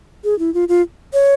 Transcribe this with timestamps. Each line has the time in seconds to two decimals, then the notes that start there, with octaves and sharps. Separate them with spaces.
0.24 G#4
0.39 E4
0.54 F4
0.69 F4
1.13 C#5